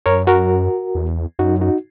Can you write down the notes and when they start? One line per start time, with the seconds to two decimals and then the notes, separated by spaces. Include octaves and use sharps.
0.06 F#2 A#4 C#5
0.27 F#4 A#4
0.95 E2
1.39 F#2 D#4 F#4
1.61 D#4 F#4